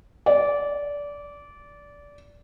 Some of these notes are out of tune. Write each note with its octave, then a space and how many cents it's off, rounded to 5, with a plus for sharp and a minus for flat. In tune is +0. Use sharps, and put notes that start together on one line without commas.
D5 -20